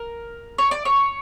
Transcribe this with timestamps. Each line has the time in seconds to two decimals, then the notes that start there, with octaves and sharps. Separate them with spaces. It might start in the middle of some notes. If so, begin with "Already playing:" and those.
Already playing: A#4
0.58 C#5
0.71 D5
0.85 C#5